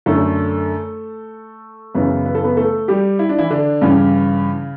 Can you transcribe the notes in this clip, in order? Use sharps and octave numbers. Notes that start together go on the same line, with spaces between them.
F#2 D3 A3 A4
F#2 C#3 E3 B3 B4
B4
A4
B3 B4
A3 A4
G3 G4
E4
D4
E3 E4
D3 D4
G2 C#3 E3 C#4